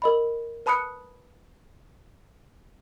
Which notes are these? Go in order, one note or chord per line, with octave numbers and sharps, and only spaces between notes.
A#4 D#5 B5
B4 A5 B5 D#6 F#6 C#7